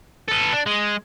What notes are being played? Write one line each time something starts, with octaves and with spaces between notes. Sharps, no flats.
A4 B4
D4
G#3